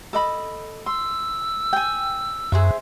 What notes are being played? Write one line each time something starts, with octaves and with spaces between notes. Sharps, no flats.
A4 D#5 B5
C6 E6
G5 G#5
F#2 G#4 C5 E5